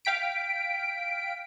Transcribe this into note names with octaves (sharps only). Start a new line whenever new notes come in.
F5 G5 B6 D7